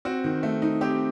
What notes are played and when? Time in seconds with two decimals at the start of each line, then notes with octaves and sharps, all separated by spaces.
0.05 C4 F#4
0.24 D#3
0.43 A3
0.62 D#4
0.81 C4 G4